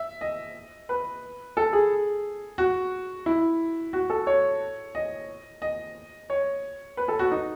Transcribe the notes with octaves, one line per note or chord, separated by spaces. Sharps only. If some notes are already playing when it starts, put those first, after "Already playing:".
Already playing: E5
D#5
B4
A4
G#4
F#4
E4
F#4
A4
C#5
D#5
D#5
C#5
B4
A4
F#4
D#4